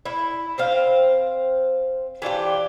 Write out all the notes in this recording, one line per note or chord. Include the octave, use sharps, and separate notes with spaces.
E4
C4 C5 F5
E3 D4 F4 G4